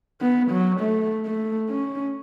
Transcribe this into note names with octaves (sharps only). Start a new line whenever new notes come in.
B3
F#3
A3
A3
C#4